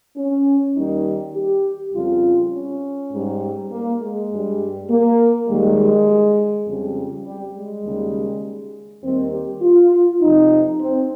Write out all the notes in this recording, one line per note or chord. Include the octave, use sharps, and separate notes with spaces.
C#4
D#2 D#3 G3 D#4
G4
F2 C#3 G3 F4
C#4
G#2 G3
A#3
G#3
G2 G3
A#3
D#2 D#3 G3 G#3
F2 C#3 G3
G3
G#3
D#2 C#3 G3
D#2 D#3 G3 C4
G4
F4
F2 C3 F3 D#4
C4